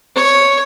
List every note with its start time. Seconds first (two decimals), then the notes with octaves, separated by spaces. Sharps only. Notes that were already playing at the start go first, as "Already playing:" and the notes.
0.16 C#5